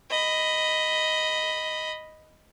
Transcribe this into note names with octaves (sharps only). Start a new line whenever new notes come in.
D#5 B5